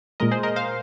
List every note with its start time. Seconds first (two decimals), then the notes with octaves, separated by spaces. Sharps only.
0.20 A#2 G#3 A#4 D#5
0.31 G#4 C5
0.43 A#4 D#5
0.56 C5 F5